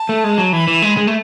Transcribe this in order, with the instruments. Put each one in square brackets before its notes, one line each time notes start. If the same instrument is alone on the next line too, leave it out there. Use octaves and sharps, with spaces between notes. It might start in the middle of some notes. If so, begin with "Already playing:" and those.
Already playing: [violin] A5
[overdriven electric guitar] A3
G#3
F#3
[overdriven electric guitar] E3 [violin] B5
[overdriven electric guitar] E3
G#3
G#3
A3